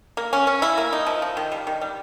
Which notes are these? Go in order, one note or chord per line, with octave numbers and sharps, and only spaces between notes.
A#3
C#4
C#4
E4
A#3
D#4
F3
F3
D#3
G3
D#3
G3